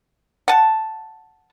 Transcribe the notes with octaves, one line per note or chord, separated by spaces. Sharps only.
F#5 A5